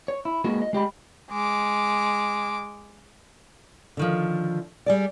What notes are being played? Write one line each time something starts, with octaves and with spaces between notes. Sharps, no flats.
C#5
E4
G#3 A#3 B3 D#4 F#4 G#4
D#5
G#3 G4 D#5 B5
G#3 D6
D3 D#3 F3
G3 G#4 D5